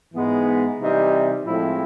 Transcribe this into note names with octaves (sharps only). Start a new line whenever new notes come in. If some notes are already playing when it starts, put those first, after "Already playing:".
G#2 E3 G#3 B3
C3 E3 G3 C4 D#4
A2 F3 G#3 C4 E4